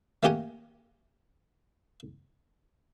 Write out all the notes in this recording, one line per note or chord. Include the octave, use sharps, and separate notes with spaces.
A3 A#3 C#4 G4 F#5 G#5